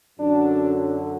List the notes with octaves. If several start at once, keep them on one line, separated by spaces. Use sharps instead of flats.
F#2 D3 F#3 D4